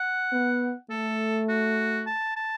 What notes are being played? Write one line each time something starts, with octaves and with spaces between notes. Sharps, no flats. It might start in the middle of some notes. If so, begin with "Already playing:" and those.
Already playing: F#5
B3
A3 A4
F#4
A5
A5